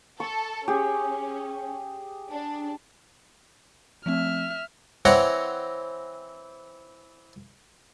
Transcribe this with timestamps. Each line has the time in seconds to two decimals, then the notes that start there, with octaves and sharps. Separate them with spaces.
0.20 A4 C#6
0.68 C#4 G4 G#4
2.30 D4
4.06 F3 A3 C4 E5 F6
5.05 E3 C4 C#5 F#5 G5 A#5